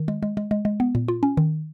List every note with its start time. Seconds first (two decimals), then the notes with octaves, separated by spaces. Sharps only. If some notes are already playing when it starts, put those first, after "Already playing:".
Already playing: D#3
0.08 G#3
0.23 G#3
0.37 G#3
0.51 G#3
0.65 G#3
0.80 B3
0.95 A#2
1.08 F4
1.23 C#4
1.37 D#3